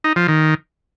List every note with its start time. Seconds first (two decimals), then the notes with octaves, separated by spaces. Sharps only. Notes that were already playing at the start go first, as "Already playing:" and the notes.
0.04 D#4
0.16 F3
0.28 D#3